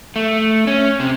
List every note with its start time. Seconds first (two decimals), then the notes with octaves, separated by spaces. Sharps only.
0.16 A3
0.67 C#4
1.00 C3